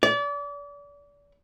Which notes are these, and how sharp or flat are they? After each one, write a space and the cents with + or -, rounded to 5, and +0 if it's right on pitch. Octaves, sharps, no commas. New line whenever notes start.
D5 -35